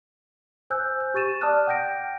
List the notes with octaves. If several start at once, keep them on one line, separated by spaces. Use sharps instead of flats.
C5 G#5 E6 F#6 G6
G6
G4 C#6 A6 D#7 E7
D5 A5 D6 D#6 F6 F#6
F#5 G5 G6 A#6 D7